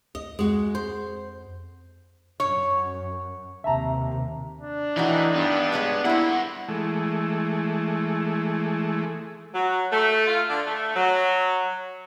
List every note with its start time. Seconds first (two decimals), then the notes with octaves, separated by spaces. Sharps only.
0.15 D2 D#5
0.39 F2 G#3 F#4
0.75 C5
2.40 F#2 C#5
3.64 D#2 C3 E5 A5 A#5
4.61 D4
4.97 A2 D#3 E3 D#4 E4 F#4
5.35 G2 B3
5.72 F#3 G#3 G4
6.05 G3 A#3 E4 C5 F#5
6.69 E3 G#3 A3
9.55 F#3
9.92 A3
10.28 F4
10.50 D3
10.66 A3
10.96 F#3